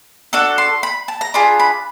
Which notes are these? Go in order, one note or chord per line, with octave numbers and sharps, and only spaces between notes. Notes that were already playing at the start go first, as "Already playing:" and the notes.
D4 F#4 A4
C6
B5
A5
A#5
D4 F4 G#4 B5
B5